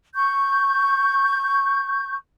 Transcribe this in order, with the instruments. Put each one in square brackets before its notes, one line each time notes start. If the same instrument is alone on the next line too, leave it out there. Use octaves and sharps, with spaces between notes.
[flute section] C#6 G6